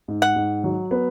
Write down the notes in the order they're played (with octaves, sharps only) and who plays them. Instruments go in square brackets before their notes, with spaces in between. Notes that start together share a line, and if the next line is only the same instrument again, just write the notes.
[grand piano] G#2
[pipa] F#5
[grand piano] G#2
F#3
B3